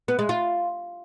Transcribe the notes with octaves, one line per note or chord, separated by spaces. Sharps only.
B3
G#3
F4